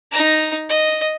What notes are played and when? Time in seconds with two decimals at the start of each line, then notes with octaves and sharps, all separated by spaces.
0.12 D#4 A#5
0.69 D#5